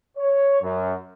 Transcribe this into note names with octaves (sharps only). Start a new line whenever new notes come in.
C#5
F#2